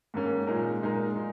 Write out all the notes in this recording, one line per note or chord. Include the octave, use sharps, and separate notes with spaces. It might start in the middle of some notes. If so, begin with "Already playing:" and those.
G#2 D#3 A#3 C#4
A#2 G#3 D#4 A#4
A#2 G#3 D#4 A#4
A#2 G#3